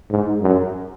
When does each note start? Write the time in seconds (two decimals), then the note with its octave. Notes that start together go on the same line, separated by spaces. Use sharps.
0.10 G#2
0.41 F#2